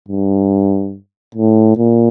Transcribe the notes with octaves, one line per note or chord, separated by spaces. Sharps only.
G2
A2
A#2